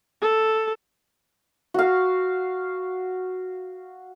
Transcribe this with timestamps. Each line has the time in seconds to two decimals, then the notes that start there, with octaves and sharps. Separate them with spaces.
0.22 A4
1.74 F#4 F5